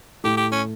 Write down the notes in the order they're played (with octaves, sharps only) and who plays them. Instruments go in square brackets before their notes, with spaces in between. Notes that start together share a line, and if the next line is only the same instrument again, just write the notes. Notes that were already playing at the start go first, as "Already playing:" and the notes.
[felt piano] A2 A3 [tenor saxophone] G4
[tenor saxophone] G4
C#4